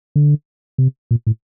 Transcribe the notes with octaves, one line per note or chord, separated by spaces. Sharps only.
D3
C3
A#2
A2